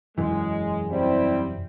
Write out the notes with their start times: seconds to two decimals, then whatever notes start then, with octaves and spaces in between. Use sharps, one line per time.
0.18 E1 F#2 E3 G#3
0.90 G3 C4 E4